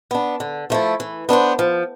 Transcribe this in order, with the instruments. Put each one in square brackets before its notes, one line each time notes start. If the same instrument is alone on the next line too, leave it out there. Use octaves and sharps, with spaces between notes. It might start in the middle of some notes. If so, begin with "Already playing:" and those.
[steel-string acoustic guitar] B3 D4
D3
F3 A3 E4
E3
B3 D4 A4 C5
F3